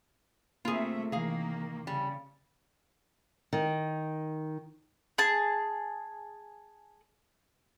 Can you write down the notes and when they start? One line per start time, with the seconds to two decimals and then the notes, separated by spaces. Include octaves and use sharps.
0.65 C3 A3 A#3 F4 G#4 E5
1.12 C3 D#3 E3 A#3 G#4 F5
1.87 C#3 G3
3.53 D#3
5.18 G#4 A5